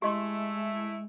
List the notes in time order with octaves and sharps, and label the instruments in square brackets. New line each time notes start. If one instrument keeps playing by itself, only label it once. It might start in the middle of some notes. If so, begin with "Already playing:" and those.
[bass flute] G#3 [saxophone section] A3 E4 [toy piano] G4 D#5 C6